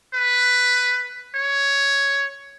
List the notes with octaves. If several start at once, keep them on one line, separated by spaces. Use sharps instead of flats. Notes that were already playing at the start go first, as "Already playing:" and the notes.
B4
C#5